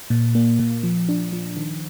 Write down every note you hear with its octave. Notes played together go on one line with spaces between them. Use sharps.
A#2
A#3
A#2
F3
D4
F3
D#3